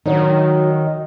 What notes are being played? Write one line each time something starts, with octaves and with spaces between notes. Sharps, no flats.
D#3 F#3 D#4